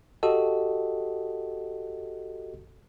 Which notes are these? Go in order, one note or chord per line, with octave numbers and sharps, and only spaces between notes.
F#4 G4 A4 D#5